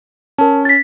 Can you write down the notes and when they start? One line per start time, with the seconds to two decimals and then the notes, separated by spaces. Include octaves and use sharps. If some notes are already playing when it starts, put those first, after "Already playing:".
0.38 C#4 A#4 A5
0.65 A6 B6